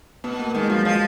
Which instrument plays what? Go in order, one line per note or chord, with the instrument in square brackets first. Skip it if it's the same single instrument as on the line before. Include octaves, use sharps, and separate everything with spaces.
[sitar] B2 [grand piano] B3
[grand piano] A#3
[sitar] D#3 [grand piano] G#3
[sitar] F3 [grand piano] F#3
[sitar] F3 [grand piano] G#3